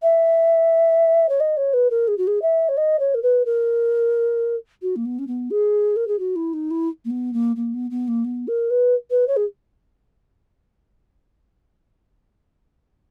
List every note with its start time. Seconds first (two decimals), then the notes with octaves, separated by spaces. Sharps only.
0.02 E5
1.29 C#5
1.40 D#5
1.57 C#5
1.73 B4
1.90 A#4
2.08 G#4
2.18 F#4
2.27 G#4
2.42 E5
2.69 C#5
2.77 D#5
2.99 C#5
3.14 A#4
3.22 B4
3.45 A#4
4.82 F#4
4.96 A#3
5.05 B3
5.19 C#4
5.27 B3
5.50 G#4
5.96 A#4
6.07 G#4
6.19 F#4
6.36 E4
6.53 D#4
6.70 E4
7.05 A#3
7.10 B3
7.33 A#3
7.56 A#3
7.74 B3
7.90 B3
8.08 A#3
8.24 B3
8.47 A#4
8.70 B4
9.10 B4
9.27 C#5
9.36 G#4